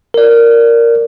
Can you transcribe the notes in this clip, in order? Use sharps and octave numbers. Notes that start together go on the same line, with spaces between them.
A#4 D5